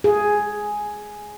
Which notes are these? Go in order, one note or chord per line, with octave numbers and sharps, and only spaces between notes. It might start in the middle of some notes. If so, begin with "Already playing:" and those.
G#4